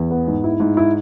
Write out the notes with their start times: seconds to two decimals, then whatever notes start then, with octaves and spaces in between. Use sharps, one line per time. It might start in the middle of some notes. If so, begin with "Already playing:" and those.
Already playing: E2
0.11 B3
0.27 G#2
0.44 E4
0.60 G#2
0.77 E4